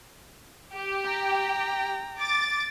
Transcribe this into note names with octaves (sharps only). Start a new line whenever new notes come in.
G4
G5 A#5
D6 A6